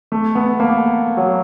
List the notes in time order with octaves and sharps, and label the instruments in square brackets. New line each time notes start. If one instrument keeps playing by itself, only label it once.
[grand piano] A3
B3
A#3
F#3